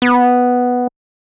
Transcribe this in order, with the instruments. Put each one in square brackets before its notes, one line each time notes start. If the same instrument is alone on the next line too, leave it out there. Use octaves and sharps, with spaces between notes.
[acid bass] B3